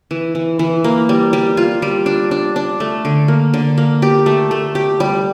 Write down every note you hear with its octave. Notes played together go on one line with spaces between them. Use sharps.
E3
E3
E3
A#3
G3
G3
F4
G3
D4
D4
D4
A3
D3
A#3
D3
A#3
G4
A3
A3
G4
G3